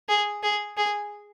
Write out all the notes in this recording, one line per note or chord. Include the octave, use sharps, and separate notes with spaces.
G#4
G#4
G#4